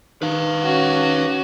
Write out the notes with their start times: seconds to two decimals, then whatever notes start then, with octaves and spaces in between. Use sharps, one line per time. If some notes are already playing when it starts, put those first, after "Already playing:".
0.22 D#3 B4 F5
0.63 C#4 F#4